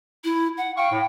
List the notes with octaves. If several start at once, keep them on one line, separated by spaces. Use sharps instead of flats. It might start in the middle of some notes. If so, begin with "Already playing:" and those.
E4
F#5
F5 G5 C#6
A2